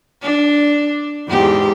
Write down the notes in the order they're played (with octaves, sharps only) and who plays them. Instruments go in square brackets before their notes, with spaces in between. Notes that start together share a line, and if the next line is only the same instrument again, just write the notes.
[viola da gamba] D4
E2 G#2 G4